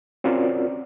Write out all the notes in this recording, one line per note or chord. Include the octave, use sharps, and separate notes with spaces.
C4 C#4 F4 F#4 A#4 D5